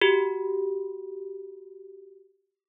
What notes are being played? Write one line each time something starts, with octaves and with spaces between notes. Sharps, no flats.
F#4 G4